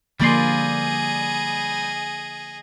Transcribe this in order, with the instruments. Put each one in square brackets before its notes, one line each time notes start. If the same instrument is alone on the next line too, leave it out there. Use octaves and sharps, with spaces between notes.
[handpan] D3 F3 A#3 [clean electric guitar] G3 D5 C6 [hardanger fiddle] G#4 D#5